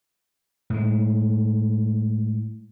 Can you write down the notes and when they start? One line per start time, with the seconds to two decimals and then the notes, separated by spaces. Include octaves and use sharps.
0.70 A2 G#3